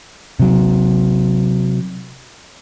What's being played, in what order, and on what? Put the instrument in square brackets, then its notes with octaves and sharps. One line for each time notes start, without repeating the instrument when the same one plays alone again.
[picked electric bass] C3 F#3